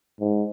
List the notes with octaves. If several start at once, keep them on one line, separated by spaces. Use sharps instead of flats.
G#2